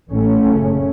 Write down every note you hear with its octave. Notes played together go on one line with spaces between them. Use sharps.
A1 A2 A3 C#4
F#1 F#2 C#3